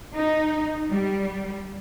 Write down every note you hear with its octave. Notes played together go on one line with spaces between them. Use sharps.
D#4
G3